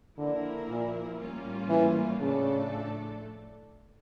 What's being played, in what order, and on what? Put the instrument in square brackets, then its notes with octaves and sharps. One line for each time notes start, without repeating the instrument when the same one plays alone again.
[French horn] D3 [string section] F3 A#3 E4 A#4
[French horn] A#2
[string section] A2 G3 A#3 C#4 F4
[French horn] E3
[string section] A2 F3 A3 D4 A4 [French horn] C#3